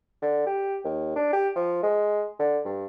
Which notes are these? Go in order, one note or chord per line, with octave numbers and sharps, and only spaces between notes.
D3
G4
D#2
D4
G4
F3
G#3
D3
G2